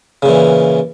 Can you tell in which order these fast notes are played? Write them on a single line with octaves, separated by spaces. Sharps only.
C#3 A#2 E3